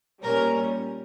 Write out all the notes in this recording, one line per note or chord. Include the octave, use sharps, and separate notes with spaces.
A#2 G3 C#4 A#4